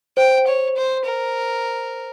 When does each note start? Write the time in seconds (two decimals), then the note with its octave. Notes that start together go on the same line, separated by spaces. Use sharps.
0.17 C5 G5
0.47 C#5
0.77 C5
1.05 A#4